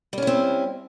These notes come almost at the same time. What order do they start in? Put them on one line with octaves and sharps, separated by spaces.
G3 C#4 E4 C4